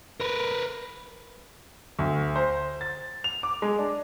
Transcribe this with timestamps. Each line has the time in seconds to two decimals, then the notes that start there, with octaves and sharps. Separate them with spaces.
0.20 A#4 B4
1.99 D2
2.36 C5
2.81 A6
3.24 F7
3.43 D6
3.62 G#3
3.79 D4